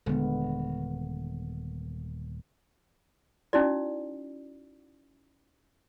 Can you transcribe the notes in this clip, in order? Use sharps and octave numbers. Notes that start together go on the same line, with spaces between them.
D#1 D3 G#3 B3
C#4 D#4 E4 F#4 D5